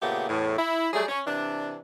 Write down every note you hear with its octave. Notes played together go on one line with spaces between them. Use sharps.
A#2 C#3 A3 B3 G4
E2 A2
E4
F#3 G3 A3 G#4
C#4
C3 E3 D4